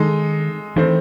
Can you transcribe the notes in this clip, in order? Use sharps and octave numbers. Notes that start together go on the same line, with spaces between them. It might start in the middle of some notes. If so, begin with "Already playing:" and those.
Already playing: D#3 G#3 D#4 A4 D#5
D#3 E3 A3 C4